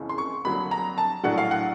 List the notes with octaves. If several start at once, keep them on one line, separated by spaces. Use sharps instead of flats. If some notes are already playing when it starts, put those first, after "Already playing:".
Already playing: F#1 F2 C#3 E3
C6
C#6
F2 D3 F#3 A#3 B5
A#5
A5
A#1 A2 F#3 A3 D4 F#5
F5
F#5